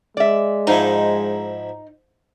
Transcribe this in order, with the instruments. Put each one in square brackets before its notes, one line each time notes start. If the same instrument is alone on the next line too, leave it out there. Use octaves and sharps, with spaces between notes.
[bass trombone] G#3 [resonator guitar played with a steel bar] D5 E5
[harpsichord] G#2 F3 E4 [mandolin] D#4